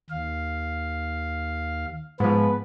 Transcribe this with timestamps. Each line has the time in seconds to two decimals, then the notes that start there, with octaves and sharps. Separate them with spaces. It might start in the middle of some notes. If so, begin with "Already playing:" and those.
0.10 D#2 F5
2.20 G#2 F3 B3 B4